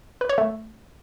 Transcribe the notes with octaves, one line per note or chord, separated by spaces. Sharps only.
B4
C#5
A3